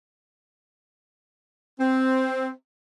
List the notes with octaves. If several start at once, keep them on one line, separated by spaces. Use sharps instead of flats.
C4